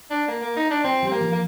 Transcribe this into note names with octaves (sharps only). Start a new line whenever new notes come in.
D4
A#3
A#3
D#4
D4
C4 F4
G3 C4
A#3
F3
A#3